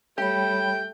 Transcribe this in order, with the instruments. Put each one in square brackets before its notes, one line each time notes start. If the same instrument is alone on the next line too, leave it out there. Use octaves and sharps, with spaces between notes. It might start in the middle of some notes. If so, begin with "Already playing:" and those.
[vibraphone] G3 C#5 B5 [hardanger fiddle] A3 [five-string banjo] G4 [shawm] G5